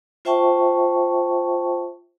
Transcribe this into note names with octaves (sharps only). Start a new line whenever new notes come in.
F4 C5 E5 G5 A5 C#6